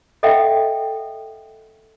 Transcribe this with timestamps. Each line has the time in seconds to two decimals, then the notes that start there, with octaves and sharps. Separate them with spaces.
0.23 A4 D#5 E5 F#5 G5